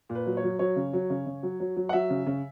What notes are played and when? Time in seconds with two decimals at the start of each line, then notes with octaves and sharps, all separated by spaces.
0.09 A#2
0.15 B4
0.26 F#3
0.37 C#5
0.43 F#3
0.59 F#3 C#5
0.76 C#3
0.93 F#3
1.10 C#3
1.26 C#3
1.43 F#3
1.60 F#3
1.76 F#3
1.89 F#5
1.93 F#3 E5
2.10 C#3
2.26 C#3